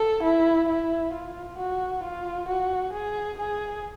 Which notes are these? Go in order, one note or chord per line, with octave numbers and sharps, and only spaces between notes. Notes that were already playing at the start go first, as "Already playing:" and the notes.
Already playing: A4
E4
E4
F4
F#4
F4
F#4
G#4
G#4